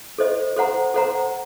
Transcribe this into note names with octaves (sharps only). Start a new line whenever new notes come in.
A4 C5 D#5
A4 C5 F#5 A#5
A4 C5 F#5 A#5